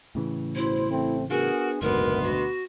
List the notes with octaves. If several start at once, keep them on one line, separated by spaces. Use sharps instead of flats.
A2 C#3 E3
A1 B2 E4 C5
A1 A3 C4
B3 D4 F#4 G#4 A#4
F#1 D2 G#2 B2 B3 A#4 C6
F#4